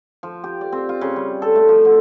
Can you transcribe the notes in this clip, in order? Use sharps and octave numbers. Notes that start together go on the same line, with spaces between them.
F3
G4
D5
C4
F4
C#3
G3
A4
A3
F3
D3